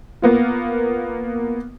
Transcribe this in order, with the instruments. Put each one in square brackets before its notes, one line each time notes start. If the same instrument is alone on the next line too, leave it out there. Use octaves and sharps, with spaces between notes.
[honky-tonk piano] A#3 B3 F4